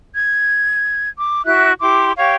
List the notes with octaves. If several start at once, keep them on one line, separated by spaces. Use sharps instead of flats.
G#6
D6
E4 F#4 E5 F#6
E4 G4 C6 D6
G4 C#5 F5 C#6